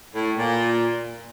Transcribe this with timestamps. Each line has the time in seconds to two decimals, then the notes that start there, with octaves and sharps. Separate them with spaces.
0.14 A2
0.36 A#2